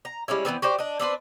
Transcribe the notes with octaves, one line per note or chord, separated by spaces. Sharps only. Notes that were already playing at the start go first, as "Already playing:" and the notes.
A#5
G3 G#3 C#4 E4
E3 G#3 B3 C4
F#4 G4 C5 D5
D4 D#5
C4 D4 B4 C5